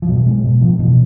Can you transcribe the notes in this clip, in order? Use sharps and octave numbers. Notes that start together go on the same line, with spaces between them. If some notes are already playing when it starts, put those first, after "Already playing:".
F3
B2 F#3
G#3
B2
F3
B2 E3